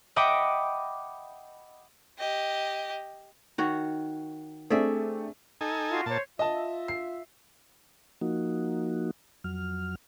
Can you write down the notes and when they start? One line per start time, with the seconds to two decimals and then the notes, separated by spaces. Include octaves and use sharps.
0.16 D#5 E5 F#5 G5 B5 D6
2.19 G4 D#5
3.58 D#3 F#4 C#5
4.70 A3 C4 D4 G#4 D5 E5
5.61 D#4 A4 G#5
5.90 F4 F#4
6.06 A#2 C5 C#5 A5
6.39 F4 D#5 E5 A5
6.88 C7
8.21 F3 A#3 D#4 F#4
9.44 F2 F#3 F6